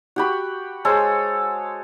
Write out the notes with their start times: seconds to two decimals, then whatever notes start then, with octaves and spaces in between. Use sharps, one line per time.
0.16 F#4 G4 B5
0.85 G#3 A4 C5 C#5